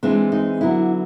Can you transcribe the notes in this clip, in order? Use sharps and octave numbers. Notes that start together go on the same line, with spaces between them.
E3 G#3 C4 D4
D#4
D3 F#3 B3 D4 E4